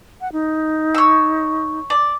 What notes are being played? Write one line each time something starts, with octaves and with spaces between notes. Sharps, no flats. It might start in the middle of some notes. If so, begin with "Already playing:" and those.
F#5
D#4
C#5 E6
D5